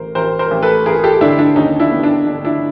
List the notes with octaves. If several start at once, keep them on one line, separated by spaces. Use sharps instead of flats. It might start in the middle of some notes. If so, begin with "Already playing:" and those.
Already playing: A1 A#4 C5
A1 A#4 C5
A#4 C5
A1
A4 B4
A1 G#4 A#4
G4 A4
D3 D4 E4
D4
D#2 C#4 D#4
D4 E4
B3
D4
D3 D4
D4 E4